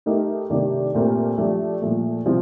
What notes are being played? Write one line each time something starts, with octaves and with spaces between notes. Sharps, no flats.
A3 D#4 G4 A#4
C3 D#3 A3 D4 G4
A#2 A3 C4 G4 A#4
F3 A3 D4 G4
A#2 F3 A3
C3 F3 C4 F4